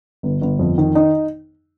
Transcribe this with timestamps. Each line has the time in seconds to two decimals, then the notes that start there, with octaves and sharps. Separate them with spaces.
0.23 G1
0.41 G1
0.59 F2
0.78 D#3
0.95 D#4